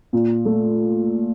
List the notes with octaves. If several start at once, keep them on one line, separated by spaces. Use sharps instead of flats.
A#2
A3